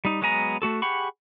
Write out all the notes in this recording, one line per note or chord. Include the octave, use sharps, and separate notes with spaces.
G3 D#4
F#3 G#3 B3 G#5 A#5
A3 F#4 A4
G4 G#4 F#5 B5 C#6